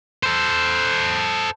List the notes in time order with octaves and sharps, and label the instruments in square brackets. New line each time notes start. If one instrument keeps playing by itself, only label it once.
[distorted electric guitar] A4 C5